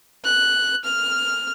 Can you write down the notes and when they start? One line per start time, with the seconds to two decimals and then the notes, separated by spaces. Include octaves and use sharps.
0.25 F#6
0.84 F6